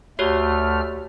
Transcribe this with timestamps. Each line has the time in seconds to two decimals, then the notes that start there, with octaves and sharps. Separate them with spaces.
0.19 D2 A3 F#4 G4 C#5 F6